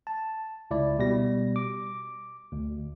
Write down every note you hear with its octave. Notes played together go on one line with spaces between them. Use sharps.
A5
C#2 E4 D5
B2 G3 A#6
D6
D2